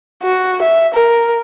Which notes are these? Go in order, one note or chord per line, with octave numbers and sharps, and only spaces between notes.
F#4
E5
A#4